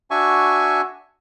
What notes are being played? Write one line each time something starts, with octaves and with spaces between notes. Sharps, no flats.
D4 F#4 E5 G#5 C#6